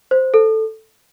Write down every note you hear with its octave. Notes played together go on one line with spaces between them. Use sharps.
C5
A4